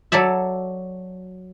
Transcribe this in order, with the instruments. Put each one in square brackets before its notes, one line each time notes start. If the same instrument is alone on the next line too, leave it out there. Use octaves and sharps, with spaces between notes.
[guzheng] F#3 A4 C#5 D5 E5